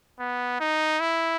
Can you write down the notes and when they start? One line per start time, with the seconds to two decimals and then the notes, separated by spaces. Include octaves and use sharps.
0.19 B3
0.60 D#4
1.00 E4